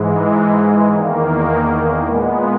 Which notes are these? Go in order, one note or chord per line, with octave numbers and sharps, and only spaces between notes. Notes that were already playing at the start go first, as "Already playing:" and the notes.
Already playing: G#2 E3 G#3
E2 D#3 A#3
A#2 G#3 B3